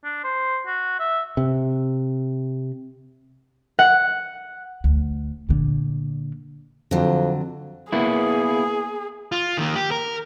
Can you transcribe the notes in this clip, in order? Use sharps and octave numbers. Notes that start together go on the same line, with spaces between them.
D4
C5
F#4
E5
C3
F#5
D2
A#2 D3
F2 D3 F#3
A#3 B3 E4 G#4
F4
D#3 A#3
G4
A#4